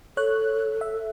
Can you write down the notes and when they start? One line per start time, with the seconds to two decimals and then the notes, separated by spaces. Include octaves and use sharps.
0.17 A4 C#5 F#6
0.81 E5